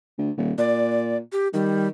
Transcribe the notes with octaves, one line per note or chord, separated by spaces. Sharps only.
D2
D#1
A#2 D5
G4
D#3 G3